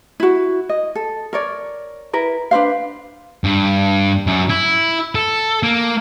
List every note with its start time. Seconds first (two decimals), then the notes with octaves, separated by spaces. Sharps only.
0.20 E4 F#4
0.69 D#5
0.95 A4
1.33 A#4 C#5 D5
2.13 E4 A#4 B4
2.51 D4 B4 C5 F5
3.44 G2
4.27 F#2
4.50 E4
5.15 A4
5.63 A#3